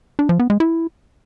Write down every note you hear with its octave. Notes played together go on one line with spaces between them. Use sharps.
D4
F3
B3
G#3
E4